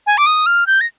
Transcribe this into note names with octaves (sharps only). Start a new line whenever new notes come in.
G#5
D6
D#6
F6
G6
A#6